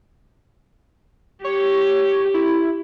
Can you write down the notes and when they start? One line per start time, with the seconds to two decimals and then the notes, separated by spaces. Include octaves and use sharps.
1.44 G4 C#5
2.34 E4